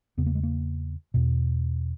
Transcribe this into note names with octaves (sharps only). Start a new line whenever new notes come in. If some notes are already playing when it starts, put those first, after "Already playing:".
E2 C#3 B3
A#3
G#3
A#3
E2 B2